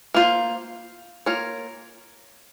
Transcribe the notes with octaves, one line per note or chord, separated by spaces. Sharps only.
A#3 F4 C5
A#3 F4 A#4 C#5